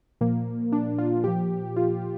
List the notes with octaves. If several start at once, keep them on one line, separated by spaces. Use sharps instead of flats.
A#2 F3 A#3
D4
F4
A#2 F3 G4
F4